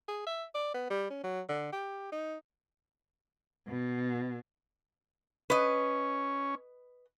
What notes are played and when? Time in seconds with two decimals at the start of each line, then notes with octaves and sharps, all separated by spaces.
0.08 G#4
0.27 E5
0.55 D5
0.74 B3
0.90 G3
1.10 C#4
1.24 F#3
1.49 D3
1.72 G4
2.12 D#4
3.68 B2
5.50 C#4 B4 D#5